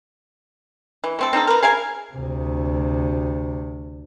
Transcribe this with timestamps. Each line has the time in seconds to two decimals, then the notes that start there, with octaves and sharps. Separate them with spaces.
1.04 E3
1.19 A3 C4 A4
1.33 C4 D#4 F4 A4
1.47 A#4 B4
1.62 G#4 A#4 F5 G#5
2.14 D2 C3